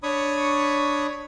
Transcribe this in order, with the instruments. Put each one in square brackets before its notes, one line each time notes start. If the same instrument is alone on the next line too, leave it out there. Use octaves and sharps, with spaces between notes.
[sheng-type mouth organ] D4 C#5 B5 C#6 D#6